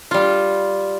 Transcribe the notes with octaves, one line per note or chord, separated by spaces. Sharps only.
G3 F4